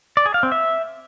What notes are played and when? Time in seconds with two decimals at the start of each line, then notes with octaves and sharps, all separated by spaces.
0.17 D5
0.26 G#4
0.34 F5
0.43 C4
0.52 E5